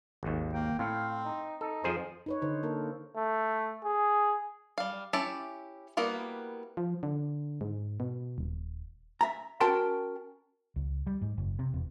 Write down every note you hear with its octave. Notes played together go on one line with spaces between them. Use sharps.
G#1 D#2
A#3 G5
A2 C4 F5
D#4
D#4 A4
F2 F3 G#4 C5
D#4 B4 C#5
D3 D#4 C5
A#3 A4 A#4
A3
G#4
G3 F5
C#4 E4 G4 E5 A5
G3 A#3 B3 E4 F#4
F3
D3
G#2
B2
D#1
E5 A#5
C#4 F#4 A#4 G5 A5 C6
C#2
G3
G#2
F#1
C3
E1